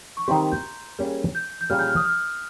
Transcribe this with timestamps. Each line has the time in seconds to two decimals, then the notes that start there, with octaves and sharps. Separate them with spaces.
0.17 C#6
0.27 D#3 G3 C4 G4 C6
0.40 A#5
0.52 G6
0.99 G3 A#3 C#4 G#4
1.35 G6
1.61 G6
1.70 A#2 G3 C#4 G#4 F6
1.79 G6
1.88 F6
1.96 D#6
2.06 F6